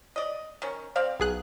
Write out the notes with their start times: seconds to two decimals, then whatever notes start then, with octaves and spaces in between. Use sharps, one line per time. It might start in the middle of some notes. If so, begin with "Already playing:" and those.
0.16 D5 D#5
0.62 D#3 C#4
0.96 C4 D5 F5
1.20 B1 G#4 F#6